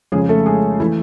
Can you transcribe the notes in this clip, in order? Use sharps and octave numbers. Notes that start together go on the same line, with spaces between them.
F2 C#3 F3 G#3 G#4
A3 A4
G#3 G#4
E3 A3 E4